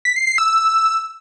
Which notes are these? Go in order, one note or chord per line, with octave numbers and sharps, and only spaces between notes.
B6
C7
C7
E6